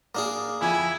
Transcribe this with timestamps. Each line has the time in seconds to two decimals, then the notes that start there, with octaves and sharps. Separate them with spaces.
0.15 A#3 D4 G#4
0.61 F2 E4 G#5